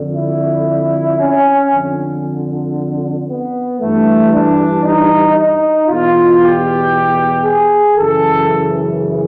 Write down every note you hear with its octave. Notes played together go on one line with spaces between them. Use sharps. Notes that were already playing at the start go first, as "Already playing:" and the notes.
Already playing: F2 D3
E4
C#4
F2 D3
B3
G2 E3 A3
D4
D#4
D#4
E2 B2 F4
G4
G#4
F#2 C#3 E3 A4